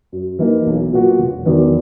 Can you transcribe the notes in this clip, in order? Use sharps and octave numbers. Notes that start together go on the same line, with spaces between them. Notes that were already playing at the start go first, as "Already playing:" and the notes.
F#2
E3 A#3 D#4
B1
A#2 F#3 B3 F#4
E1
E2 D#3 F#3 B3